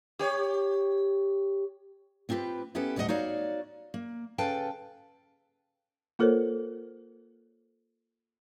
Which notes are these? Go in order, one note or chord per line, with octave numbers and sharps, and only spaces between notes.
G4 C#5
B3 C4 F4 G4 B4
B3 C#4 E4 G4 A4 B4
D2 A2 G3 B3 D#5 F#5
D#4 F#4 C#5 D5 F5
A#3
C#3 A4 B4 F5 G5 A5
A#3 F4 A4 A#4 C5 C#5